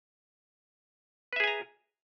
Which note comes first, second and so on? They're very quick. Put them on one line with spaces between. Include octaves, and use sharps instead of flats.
B4 E5 G#4 G#5 A#5